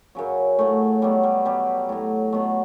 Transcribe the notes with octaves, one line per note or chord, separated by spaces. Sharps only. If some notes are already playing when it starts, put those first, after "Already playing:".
F#2 C#3 F#3
A2 F#3 A3
B2 F#3 G3
G3
B2 F#3 G3
A2 F#3
B2 F#3 A3